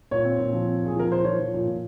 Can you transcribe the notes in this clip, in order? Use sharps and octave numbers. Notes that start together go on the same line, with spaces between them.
A#2 C#5
C4
A#2
F3
C4
A#2 G#4
F3 A#4
A#2 C5
F3 C#5
F3
A#2
A#2